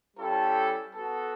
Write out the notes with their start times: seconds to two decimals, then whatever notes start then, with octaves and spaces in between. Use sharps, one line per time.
0.17 G3 C#4 E4 G4 A4
0.94 B3 F#4 A4